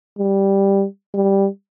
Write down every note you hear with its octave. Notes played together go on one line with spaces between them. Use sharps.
G3
G3